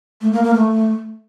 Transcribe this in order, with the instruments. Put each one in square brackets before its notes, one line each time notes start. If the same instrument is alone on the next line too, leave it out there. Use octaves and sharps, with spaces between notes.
[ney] A3
A#3
A#3
A3